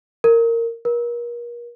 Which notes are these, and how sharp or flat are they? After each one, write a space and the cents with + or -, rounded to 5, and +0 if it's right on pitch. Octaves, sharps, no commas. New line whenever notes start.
A#4 -15
A#4 +35